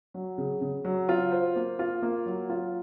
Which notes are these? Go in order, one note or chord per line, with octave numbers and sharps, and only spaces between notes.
F#3
C#3
C#3
F#3
F4
C5
A#3
F4
A#3
F#3
F4